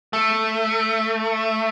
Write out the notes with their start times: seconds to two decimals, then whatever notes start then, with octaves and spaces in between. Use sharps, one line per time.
0.13 A3